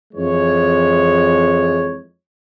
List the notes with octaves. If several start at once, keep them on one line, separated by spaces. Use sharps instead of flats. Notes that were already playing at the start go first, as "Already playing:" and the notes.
F2 E3 G#3 C#5